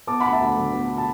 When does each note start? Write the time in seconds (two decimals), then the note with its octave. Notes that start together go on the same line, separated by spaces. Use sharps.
0.07 B3 A5 D6
0.20 D2 F#5 B5
0.32 E5 A5
0.41 D2
0.57 D3
0.73 B3
0.98 A5